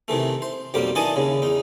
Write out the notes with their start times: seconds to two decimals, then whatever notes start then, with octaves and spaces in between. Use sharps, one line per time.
0.08 C3 D#3 E3 A3
0.42 C5
0.74 B1 F2 G3 A#3 G4
0.95 D#3 E3 D4 D#5 G#5 A5
1.16 D#2 C#3
1.42 E2 D#4